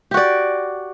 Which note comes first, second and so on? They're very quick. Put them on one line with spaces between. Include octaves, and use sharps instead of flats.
G4 F#4 D5